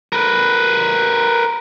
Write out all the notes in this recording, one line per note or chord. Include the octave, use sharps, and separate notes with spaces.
A#4 B4